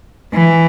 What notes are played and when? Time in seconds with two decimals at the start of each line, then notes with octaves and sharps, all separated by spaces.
0.33 E3